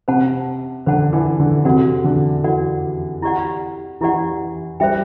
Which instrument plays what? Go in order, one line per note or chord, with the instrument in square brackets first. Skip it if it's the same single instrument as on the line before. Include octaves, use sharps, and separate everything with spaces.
[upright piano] C3 [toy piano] C5 F#5 A5
[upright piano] D3 [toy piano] C5 F#5 A5
[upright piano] E3
D3
[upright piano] C3 [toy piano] F#4 A4 D5 F#5
[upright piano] D3
[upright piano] E3 [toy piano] F#4 A4 D5 F#5
[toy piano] E4 G4 D5 F#5
[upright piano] E3 [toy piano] E4 G4 D5 F#5
[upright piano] G3 [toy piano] C5 E5 G5